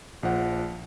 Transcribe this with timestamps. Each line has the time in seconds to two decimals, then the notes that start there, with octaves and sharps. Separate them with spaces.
0.23 A#1 F3 F#5